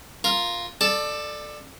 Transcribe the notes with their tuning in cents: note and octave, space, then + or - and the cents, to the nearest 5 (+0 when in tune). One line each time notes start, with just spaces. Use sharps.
F4 +0 A#4 +0
A4 +0 D5 +20 A5 +0